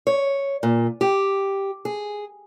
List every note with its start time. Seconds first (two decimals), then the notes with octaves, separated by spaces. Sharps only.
0.07 C#5
0.63 A#2
1.01 G4
1.85 G#4